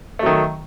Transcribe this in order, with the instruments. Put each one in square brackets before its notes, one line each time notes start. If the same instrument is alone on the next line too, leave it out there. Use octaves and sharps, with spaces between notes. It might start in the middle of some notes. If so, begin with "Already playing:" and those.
[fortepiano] A3
F#3
D#3